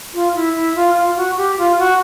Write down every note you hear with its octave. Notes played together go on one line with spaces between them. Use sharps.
F4
E4
E4
F4
F4
F#4
G4
F4
F#4